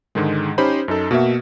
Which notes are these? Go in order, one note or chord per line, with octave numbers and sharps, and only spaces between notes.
G#2 D3 D#3 G#3
C#4 D#4 G4 C5 B5
F#2 D#4 A4
B2 A#3 F#4 E5